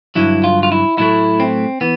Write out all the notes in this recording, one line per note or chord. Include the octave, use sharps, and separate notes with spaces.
G2 D3 F#3 E4
F4
F4
E4
A2 F#3 A3 E4
C4
E3 B3